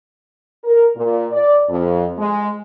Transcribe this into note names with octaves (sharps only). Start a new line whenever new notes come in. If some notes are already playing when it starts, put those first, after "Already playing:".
A#4
A#2
D5
F2
G#3